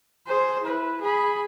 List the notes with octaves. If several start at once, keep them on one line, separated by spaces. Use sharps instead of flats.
G#4 C5
E4 B4
G#4 B5